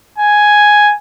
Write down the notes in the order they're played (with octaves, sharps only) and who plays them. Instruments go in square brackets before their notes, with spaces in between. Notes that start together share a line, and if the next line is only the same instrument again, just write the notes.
[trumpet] G#5